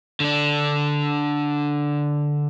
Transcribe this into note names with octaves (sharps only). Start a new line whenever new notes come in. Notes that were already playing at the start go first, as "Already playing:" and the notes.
D3 D4